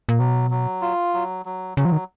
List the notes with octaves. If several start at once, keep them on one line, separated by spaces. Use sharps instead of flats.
A#2
B2 F#3
F#3
F4
F#3
F#3
C#3 F#3
F3
D#3